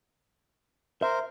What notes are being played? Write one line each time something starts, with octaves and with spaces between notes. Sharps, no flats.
A#4 C5 E5